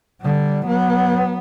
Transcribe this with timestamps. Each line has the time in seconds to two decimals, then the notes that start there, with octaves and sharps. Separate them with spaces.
0.21 D3 G3
0.66 F#3 B3